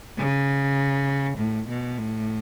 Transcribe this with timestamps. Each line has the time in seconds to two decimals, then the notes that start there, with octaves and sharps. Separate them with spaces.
0.18 C#3
1.38 A2
1.69 B2
1.98 A2